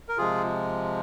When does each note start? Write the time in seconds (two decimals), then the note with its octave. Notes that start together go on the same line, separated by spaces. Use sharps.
0.09 A#4
0.18 C3 F3 G#3 F4 G#4